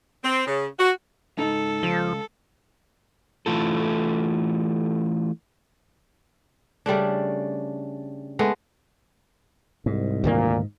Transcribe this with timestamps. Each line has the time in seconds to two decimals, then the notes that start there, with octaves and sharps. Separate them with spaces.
0.24 C4
0.47 C#3
0.79 F#4
1.39 C#2 G#2 D#4 A4
1.83 C#2 F3
3.46 E3 A3 F4 A4
6.86 C#3 G3 A3 D4
8.39 G#3 A3 B3
9.86 C2 G#2
10.24 D2 A#2 D#3 A#3